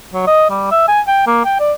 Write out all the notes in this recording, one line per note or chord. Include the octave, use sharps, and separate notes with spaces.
F#3
D#5
G3
E5
G#5
G5
A#3
G5
D5